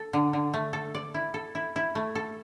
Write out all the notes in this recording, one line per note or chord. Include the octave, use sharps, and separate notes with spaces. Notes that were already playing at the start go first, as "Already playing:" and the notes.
Already playing: A4
D3
D3
A3
A4
D5
E4
A4
E4
E4
A3
A4